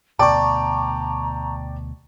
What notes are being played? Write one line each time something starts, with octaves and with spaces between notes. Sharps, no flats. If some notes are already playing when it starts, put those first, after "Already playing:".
D2 B2 D5 G5 A5 A#5 C#6 D6